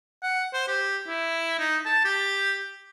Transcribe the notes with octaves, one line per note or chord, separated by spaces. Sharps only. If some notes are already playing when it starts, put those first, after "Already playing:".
F#5
C5
G4
E4
D#4
A5
G4